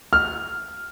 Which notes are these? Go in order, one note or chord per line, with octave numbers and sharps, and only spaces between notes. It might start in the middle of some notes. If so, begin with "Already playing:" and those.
F6